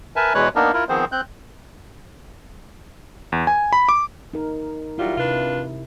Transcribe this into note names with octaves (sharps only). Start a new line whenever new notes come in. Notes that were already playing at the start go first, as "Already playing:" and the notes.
A#4 B4 E5 G#5 A5
E2 B2 G#3 B4 C#5 F#6
A#3 B3 D4 D#4 A#4
E4 F4 A#4
D#3 F3 B3 C4 G#4 C5
C4 F#6 G6
E2
G#5
B5
D6
D#4 A#4
F#3 G3 E4 F4
C3 D4 F4 B4